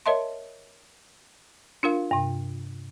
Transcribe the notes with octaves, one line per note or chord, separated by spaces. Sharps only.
A#4 C#5 D#5 E5 A5 C6
D4 F4 A#4 F5
G2 C3